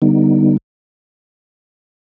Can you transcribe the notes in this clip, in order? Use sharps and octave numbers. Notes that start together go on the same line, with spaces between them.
D3 G3 B3 D#4